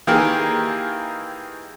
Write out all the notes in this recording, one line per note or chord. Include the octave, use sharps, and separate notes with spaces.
D#3 E3 A#3 G4 G#4 A#4